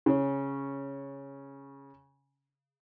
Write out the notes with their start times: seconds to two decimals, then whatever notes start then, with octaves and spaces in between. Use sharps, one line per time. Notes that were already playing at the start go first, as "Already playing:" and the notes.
0.06 C#3 C#4